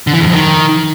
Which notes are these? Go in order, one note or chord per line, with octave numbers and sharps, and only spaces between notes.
D3
E3
E2
F2
D#3